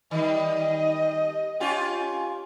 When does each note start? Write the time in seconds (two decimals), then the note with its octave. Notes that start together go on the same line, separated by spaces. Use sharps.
0.11 D#3 G3 D#5
1.60 C#4 F4 G4